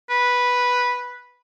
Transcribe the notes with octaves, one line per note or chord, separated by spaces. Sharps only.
B4